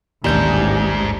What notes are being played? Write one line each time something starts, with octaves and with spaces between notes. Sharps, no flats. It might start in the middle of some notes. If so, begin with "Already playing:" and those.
A1 D#2 G#2 G3 D4 G6